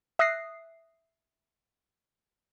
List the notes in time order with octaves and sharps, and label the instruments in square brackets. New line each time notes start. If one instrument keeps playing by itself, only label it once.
[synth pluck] E5 D#6 F#6 A#6 C7